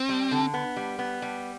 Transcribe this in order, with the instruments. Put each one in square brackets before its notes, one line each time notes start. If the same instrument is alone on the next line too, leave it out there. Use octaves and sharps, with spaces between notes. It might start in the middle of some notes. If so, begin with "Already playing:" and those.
Already playing: [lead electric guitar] C4
[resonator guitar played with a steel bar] G3
D3
B3
G3
B3
G3